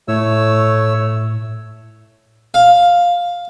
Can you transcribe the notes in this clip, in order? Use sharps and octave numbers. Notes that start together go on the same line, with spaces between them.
A2 A3 C#5 E6
F5